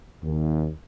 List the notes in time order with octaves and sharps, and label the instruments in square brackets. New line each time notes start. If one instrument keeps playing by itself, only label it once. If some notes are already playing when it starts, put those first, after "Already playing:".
[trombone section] D#2